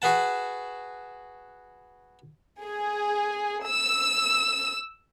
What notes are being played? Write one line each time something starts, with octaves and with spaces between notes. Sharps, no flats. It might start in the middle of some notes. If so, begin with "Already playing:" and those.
F#4 G#4 B4 F#5 A5
G#4
E6